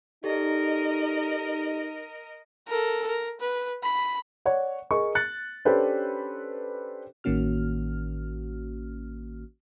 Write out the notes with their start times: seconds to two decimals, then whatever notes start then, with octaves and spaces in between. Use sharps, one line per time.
0.24 D#4 G4 A4 A#4 D5 D#5
2.67 A4 A#4
3.07 A#4
3.40 B4
3.83 B5
4.46 C#5 D5 F#5
4.91 G#4 A#4 D#5 C#6
5.15 F#6 A6 C#7
5.65 C#4 D4 G4 A4 B4 C5
7.24 A1 D#3 A#3 C#4 F#4 F6